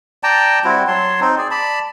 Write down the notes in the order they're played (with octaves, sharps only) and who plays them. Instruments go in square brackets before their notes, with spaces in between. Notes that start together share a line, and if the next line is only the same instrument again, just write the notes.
[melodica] D5 G5 A5 A#5
G3 C4 E4 F#4
F#3 C#5 A5 C6
C4 D#4
G#4 D5
D5 A5 B5